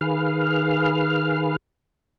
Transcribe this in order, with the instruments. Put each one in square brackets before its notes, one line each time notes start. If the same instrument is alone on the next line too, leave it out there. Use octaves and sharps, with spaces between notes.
[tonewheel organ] D#3 G#4 B4 F5 F6